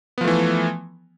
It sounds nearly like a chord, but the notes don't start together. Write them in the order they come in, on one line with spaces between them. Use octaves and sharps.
B3 F3 A3 E3